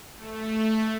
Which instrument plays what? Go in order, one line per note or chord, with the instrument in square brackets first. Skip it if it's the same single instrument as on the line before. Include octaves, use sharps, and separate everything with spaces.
[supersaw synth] A3